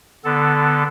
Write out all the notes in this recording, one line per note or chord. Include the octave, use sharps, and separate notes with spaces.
D3 B3 A4